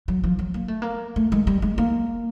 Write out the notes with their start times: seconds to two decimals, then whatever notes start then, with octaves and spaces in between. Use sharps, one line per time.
0.08 F#3
0.24 F3
0.39 F#3
0.54 A#3
0.68 A3
0.82 A#3
1.16 A3
1.32 G#3
1.47 G3
1.62 G#3
1.78 A#3